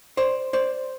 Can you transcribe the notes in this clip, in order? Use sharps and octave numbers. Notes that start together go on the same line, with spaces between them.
C5 D5
C5 D5